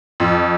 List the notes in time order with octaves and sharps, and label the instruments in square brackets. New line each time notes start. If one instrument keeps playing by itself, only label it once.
[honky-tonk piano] F2